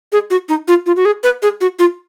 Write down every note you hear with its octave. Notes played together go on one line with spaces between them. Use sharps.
G#4
F#4
D#4
F4
F4
F#4
G#4
B4
G#4
F#4
F4